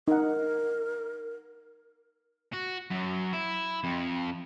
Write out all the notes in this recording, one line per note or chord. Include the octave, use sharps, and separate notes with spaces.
D#4 A#4 F#5
F#4
F#2
E4
F2